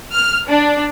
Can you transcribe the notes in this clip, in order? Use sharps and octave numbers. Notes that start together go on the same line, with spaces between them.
F6
D4